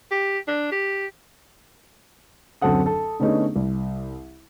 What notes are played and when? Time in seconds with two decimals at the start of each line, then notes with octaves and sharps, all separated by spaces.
0.11 G4
0.48 D4
0.72 G4
2.62 D1 F#2 C4 A4 F#5 D#6
2.86 A4
3.20 D3 A3 B3 C#4 D#4 G#4
3.56 C2